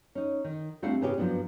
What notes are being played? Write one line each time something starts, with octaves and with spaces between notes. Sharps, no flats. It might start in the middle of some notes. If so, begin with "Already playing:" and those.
C#4 D#4
D#3
G3 A3 C4 D4 F5 F#5
G#2 C#3 B3 C#4 F4 G4
G2 F3 F#3 B3 D4